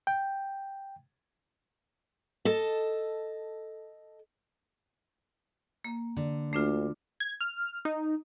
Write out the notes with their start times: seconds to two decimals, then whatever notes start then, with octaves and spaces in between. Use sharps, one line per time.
0.07 G5
2.45 A4 D#5 A5
5.84 A#3
6.17 D3
6.53 D2 A3 D4 F4
7.20 G#6
7.41 F6
7.85 D#4